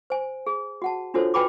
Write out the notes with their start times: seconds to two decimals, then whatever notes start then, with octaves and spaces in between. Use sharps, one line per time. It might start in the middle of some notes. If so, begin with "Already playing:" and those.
0.10 C5 G#5
0.47 G#4
0.82 F#4 F#5 A5
1.14 D4 F4 F#4 A4 C5 C#5
1.34 F#4 B4 G5 G#5 B5 D6